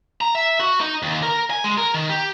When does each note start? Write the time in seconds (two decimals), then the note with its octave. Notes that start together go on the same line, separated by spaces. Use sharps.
0.21 A#5
0.35 E5
0.60 F#4
0.81 D#4
1.03 D#2
1.23 A#4
1.50 G#5
1.64 G#3
1.78 A#4
1.94 D#3
2.09 G4